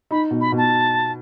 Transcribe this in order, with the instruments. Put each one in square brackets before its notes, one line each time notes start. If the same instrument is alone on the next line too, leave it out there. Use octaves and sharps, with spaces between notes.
[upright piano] D#4 [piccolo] B5
[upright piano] B2
[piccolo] B5
[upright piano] B2
[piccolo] A5